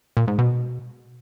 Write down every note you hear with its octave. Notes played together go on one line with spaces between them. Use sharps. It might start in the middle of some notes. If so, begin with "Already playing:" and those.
A#2
G#2
B2